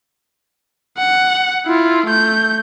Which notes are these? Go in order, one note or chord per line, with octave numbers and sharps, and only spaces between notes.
F#5
E4 F4
A3 G6